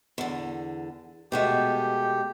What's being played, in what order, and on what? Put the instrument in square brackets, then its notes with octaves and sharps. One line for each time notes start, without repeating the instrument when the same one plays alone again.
[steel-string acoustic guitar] E2 D3
[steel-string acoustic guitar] B2 G#3 A3 [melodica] G4